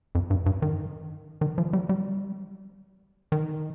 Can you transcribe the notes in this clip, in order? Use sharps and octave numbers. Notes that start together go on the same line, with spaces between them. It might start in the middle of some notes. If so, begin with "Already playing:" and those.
F2
G2
G2
D#3
D#3
F3
G3
G3
D#3